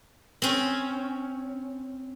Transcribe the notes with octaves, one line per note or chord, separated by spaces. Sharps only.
C4 C#4